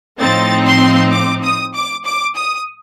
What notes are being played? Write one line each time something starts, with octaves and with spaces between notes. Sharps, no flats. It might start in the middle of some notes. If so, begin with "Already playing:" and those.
A2 F3 C4 D#4 A6
C6
D6
D#6
D6
D6
D#6